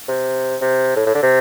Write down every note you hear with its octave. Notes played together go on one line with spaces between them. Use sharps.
C3
C3
A2
A2
D3
C3